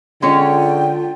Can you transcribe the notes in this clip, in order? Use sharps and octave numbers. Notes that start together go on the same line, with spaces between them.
D3 G#3 C#4 F4 C#5 G5